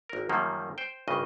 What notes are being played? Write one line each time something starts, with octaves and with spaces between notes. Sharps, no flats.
G#1 A#4
F#2 D#3 F3 G3 A#3
C5 G5
G#1 G2 C#3 D#5